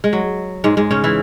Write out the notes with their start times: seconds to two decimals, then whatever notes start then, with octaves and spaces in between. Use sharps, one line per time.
0.04 G#3
0.13 F#3
0.64 G#2 G#3
0.77 G#2 G#3
0.91 C#3 C#4
1.04 E3 E4